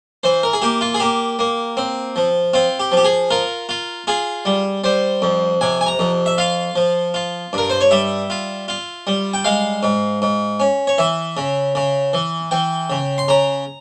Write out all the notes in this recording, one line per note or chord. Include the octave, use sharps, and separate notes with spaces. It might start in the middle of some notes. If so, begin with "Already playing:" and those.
E3 C5
A#4
G#4
A#3 G4
F4
G#4
A#3 G4
A#3
C4
F3
C4 F4
G4
F3
G4
G#4
F4 A#4
F4
F4 G#4
G3
G3 C5
F2
C3 G#5
G#5
A#5
F2
E5
F4 F5
F3
F4
G2 A#4
C5
C#5
G3 E5
F4
F4
G3
G5
G#3 F5
G#2
G#2
C#4
C#5
E3 E5
C#3
C#3
E3
E3 G5
C#3
C6
C#3 A#5